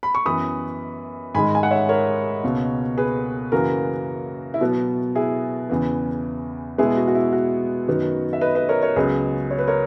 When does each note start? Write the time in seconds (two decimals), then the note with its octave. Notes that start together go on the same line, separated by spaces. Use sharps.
0.03 B5
0.15 C#6
0.26 F#2 E3 B3 B5 D#6
1.34 G#2 D#3 G#3 G#5 B5
1.55 G#5
1.63 F#5
1.71 C#5 E5
1.89 A#4 C#5
2.43 C#2 B2 A#3
2.97 G#4 B4
3.52 F#2 C#3 E3 A#3 F#4 A#4
4.54 E4
4.61 B2 F#3 B3 F#4
5.15 E4 G#4
5.70 E2 C#3 E3
6.78 B2 G#3 B3 E4 G#4
6.97 F#4
7.08 F#4
7.15 E4
7.33 F#4
7.87 F#2 D#3 F#3 B3
8.33 E5
8.41 B4 D#5
8.55 B4 D#5
8.69 A#4 C#5
8.82 A#4 C#5
8.96 C#2 C#3 F#3 B3 G#4 B4
9.51 C#5
9.59 B4
9.67 A#4 C#5